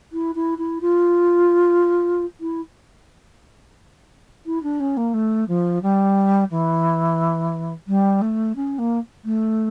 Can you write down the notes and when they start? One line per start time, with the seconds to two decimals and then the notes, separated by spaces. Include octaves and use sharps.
0.12 E4
0.35 E4
0.58 E4
0.81 F4
2.40 E4
4.46 E4
4.63 D4
4.80 C#4
4.97 A#3
5.14 A3
5.48 F3
5.82 G3
6.50 E3
7.87 G3
8.21 A3
8.56 C#4
8.78 A#3
9.24 A3